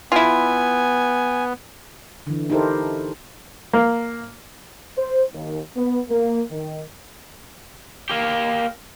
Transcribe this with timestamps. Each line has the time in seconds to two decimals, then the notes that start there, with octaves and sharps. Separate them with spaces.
0.12 B3 E4 F4 G#5
2.27 D3 E3
2.50 D#4 E4 G4 A4 A#4 C5
3.73 A#3
4.97 C5
5.33 D#2
5.76 B3
6.08 A#3
6.50 D#3
8.10 A#3 G4